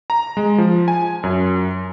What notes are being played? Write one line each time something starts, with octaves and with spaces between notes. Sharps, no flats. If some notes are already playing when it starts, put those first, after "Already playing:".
A#5
G#3
F3
G#5
F#2